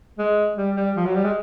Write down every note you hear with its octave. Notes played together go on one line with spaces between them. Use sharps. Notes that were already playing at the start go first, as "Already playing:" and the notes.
G#3
G3
G3
F3
F#3
G3
G#3